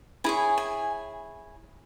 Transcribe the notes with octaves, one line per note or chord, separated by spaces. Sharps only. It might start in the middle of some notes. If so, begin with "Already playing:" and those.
E4 G#4 C#5 G#5
G#5